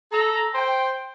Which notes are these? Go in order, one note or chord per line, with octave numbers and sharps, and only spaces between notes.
A4 A#5
C5 G5